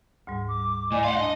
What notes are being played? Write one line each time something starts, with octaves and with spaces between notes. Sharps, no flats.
D2 G#2 G3
D6
A2 D5 D#5 G#5
F5 F#5 C6
D4 D#5 A5